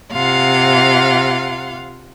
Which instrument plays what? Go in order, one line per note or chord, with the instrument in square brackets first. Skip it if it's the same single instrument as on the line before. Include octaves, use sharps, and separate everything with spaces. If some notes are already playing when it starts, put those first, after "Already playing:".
[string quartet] C3 F4 F5 F#5